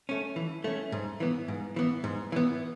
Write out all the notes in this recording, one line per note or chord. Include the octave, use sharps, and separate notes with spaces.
A3 C#4
E3
A3 C#4
G#2
E3 B3
G#2
E3 B3
G#2
E3 B3